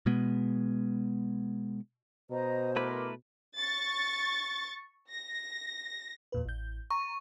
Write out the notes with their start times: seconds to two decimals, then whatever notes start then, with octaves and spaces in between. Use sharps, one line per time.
0.06 B2 G#3 B3
2.30 B2 C5 D#5 A#5
2.76 A3 E4 A#4 B4 C6 D6
3.56 C#6 A6
5.10 A#6
6.32 E2 A#2 B4
6.45 A1 G6
6.91 A#5 C#6